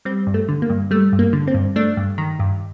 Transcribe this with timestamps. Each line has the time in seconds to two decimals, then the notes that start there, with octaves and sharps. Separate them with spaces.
0.05 G3 C4
0.27 G2
0.34 A3
0.48 D3
0.62 A#3
0.69 G2
0.91 G3 A3
1.13 G2
1.19 A#3
1.33 D3
1.47 C4
1.54 G2
1.76 A3 D4
1.97 G2
2.18 D#3
2.39 G2